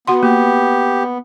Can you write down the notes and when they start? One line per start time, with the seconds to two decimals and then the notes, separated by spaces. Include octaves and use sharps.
0.07 B3 F#4 F#5 C6
0.23 A#3 G4